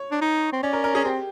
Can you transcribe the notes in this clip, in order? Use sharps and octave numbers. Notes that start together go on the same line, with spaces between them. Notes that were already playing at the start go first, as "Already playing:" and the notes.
Already playing: C#5
D4
D#4
C4
C#4 D5
A#4
A#4
C#4 G#4
C4 G4